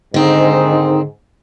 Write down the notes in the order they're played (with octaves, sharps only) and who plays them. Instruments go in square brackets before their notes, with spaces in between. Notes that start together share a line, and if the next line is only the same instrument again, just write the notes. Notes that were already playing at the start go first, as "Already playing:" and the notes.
[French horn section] G#2 [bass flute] D3 [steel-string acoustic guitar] D#3 C4 [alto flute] D#4